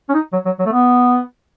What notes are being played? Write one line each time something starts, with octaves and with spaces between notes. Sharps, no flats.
C#4
D#4
F#3
F#3
F#3
A3
B3